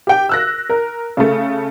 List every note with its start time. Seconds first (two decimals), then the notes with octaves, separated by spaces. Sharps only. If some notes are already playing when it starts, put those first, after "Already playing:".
0.07 G4 G5
0.29 E6 F#6 A#6
0.69 A#4
1.17 C#3 A3